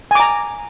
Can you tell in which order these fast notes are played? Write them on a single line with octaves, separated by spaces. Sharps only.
G#5 D6 A#5